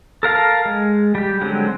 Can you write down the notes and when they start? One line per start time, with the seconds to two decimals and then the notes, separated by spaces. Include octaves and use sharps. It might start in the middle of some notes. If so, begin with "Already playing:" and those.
0.23 A4 A#4 F5 A5
0.66 G#3
1.15 G3 G4
1.41 D3 F#3 G#3 C4